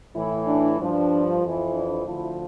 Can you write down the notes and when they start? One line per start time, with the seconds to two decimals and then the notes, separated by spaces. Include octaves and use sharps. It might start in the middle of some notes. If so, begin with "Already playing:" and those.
0.15 A2 E3 E4
0.47 D4
0.79 G2 F3 D4
1.42 F2 E3
1.75 D4
2.06 D2 D3 F3 E4